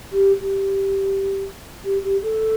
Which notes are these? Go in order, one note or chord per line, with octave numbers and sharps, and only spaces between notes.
G4
G4
G4
G4
A4